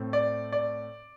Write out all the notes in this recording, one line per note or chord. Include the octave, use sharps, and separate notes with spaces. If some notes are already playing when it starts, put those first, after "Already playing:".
Already playing: A2 A3 C4
D5
D5